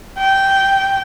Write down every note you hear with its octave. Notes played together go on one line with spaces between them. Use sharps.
G5